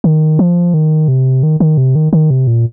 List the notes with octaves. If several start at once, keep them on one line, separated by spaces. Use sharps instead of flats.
D#3
F3
D#3
C3
D#3
D#3
C3
D#3
D#3
C3
A#2